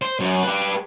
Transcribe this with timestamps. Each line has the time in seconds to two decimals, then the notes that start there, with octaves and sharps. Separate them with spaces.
0.02 C5
0.20 F#2
0.43 G4 B4